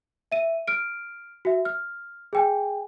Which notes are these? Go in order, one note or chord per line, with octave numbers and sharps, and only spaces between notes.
E5 D#7
F6 D7
F#4 E5
F6
G#4 G5 G#5